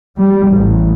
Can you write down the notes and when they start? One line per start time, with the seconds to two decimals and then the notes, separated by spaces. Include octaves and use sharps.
0.19 G3
0.51 A1